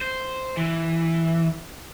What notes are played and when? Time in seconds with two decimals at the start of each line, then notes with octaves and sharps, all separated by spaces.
0.01 C5
0.57 E3